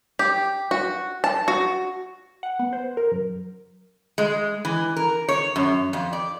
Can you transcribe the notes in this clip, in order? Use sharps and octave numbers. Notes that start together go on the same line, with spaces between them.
G4
F#4
A5
F#4
F#5
B3
C5
A#4
F#2
G#3
E3
A#4
C#5
F#2
F2
D5